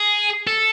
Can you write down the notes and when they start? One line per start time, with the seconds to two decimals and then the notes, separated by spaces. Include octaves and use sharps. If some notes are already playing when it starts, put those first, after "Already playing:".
Already playing: G#4
0.47 A4